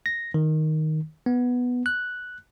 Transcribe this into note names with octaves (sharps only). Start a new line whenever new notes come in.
A#6
D#3
B3
F#6